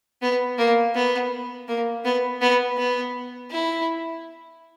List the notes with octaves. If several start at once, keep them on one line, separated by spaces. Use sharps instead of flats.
B3
A#3
B3
A#3
B3
B3
B3
E4